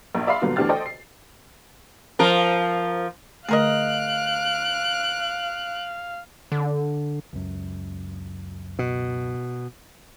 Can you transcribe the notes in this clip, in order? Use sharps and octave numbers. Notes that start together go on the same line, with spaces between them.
A#1
D5 E5 F5 B5 C6 C7
G2 A#2 D3 F#3 B3 F4
D2 E3 D4 G4 F6 A6
A4 C5 D5 D#5 G5
C7
F3 A#4
D3 A3 G#4 A#4 D#5 F5 F#6 D7
D3
C#2 F#2
B2